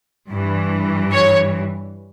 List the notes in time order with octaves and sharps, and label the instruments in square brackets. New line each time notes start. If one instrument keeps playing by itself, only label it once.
[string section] G2 E3
C#5